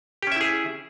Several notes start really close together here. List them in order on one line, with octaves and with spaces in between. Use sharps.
G4 C#4 E5 E4 G#4